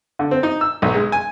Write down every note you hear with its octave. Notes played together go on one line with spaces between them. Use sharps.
D3
C4
D#4
E6
B1
G#3
G#5